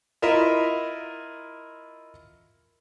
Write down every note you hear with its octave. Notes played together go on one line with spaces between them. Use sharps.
E4 F4 A#4 D#5 E5